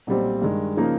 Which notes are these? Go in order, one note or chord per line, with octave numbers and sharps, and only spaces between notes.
B1 A#2 G3 C4
G2 D#3 G#3
C#3 F3 A#3 D#4